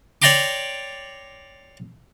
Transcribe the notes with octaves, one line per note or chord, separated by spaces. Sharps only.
C#5 D5 G5 A#5 C6 D6